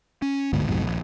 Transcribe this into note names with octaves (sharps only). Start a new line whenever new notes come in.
C#4
G1 D2 G#2 B2
B1 F2 G#2 B2
D#1 A#1